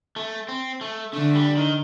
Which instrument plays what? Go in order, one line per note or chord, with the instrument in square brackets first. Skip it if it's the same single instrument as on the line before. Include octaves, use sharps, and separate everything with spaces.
[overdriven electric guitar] A3
C4
A3
[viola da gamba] D3 [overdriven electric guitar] A3
[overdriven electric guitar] G3
D#3